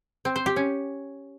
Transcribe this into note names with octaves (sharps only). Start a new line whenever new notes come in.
C4
C5
G4
C#4